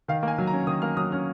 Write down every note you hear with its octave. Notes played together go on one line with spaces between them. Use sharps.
D#3 F5
A#3 G#5
F#3
A#5
C#4
D#3 D#6
A#3 F6
F#3 D#6
C#4 F6